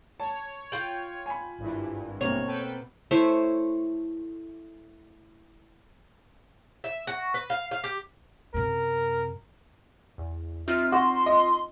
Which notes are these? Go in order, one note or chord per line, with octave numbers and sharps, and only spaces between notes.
C#5 A5
F4 G5 F#7
G#5 B5
G#1 G2 E3
B2 A#3 C4 C#5
A4 B4 G5
A3 E4 C5 C#5
E5
F#4
B4
F5
F5
G4
F#2 C3 A#4
E2
C4 D#4 F4 E5 F6
F#4 C6
D#5